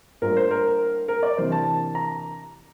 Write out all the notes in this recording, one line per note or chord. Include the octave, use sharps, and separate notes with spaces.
A2 G3 A#3 D4 F4 A#4
C5
A#4
A#4
D5
C3 E3 A#3 D4 C5
A5
A#5